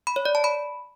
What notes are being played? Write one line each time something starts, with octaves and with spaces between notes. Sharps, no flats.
B5
C#5
D5
A5
B5